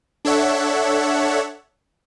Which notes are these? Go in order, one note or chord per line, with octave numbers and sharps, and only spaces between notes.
D4 A4 C#5 E5 F#5